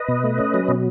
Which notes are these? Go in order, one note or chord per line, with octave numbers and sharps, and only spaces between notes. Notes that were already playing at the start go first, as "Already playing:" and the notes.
Already playing: B4 D#5
B2
A3
C#4
F#3
B2